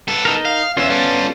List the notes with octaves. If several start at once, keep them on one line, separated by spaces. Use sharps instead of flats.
B3 A4
D#4 A#4
F5
E2 B3 C#4 F4 E5
G3 A4